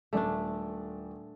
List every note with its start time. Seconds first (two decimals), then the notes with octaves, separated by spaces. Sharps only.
0.13 D#1 A3 D4 D5 G#5